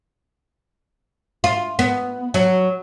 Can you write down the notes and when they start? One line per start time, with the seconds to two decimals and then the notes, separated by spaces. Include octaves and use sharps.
1.44 F4
1.79 B3
2.34 F#3